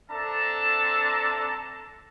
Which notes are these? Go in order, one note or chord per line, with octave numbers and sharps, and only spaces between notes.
C4 D4 A4 E5 A5 A#5